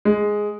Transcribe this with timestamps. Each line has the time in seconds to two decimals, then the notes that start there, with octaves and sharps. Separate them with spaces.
0.05 G#3